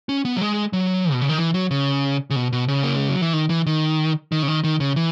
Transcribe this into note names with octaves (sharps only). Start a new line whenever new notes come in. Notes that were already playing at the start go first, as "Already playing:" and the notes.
C#4
B3
F#3
G#3
F#3
B2
C#3
D#3
E3
F#3
C#3
C#3
B2
B2
C#3
A#3
G#3
F#3
E3
D#3
E3
D#3
D#3
C#3
D#3
D#3
C#3
E3